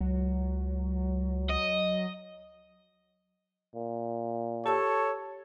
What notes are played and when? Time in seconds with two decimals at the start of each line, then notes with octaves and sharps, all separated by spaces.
0.01 C#2 F#3
1.49 D#5
3.75 A#2
4.66 G4 A4 C#5 A5 E6